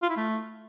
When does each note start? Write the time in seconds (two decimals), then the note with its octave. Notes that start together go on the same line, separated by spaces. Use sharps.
0.03 F4
0.10 E4
0.17 A3